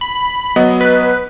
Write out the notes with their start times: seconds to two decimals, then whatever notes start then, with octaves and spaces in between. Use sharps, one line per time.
0.01 B5
0.56 F#3 B3 D#5
0.81 B4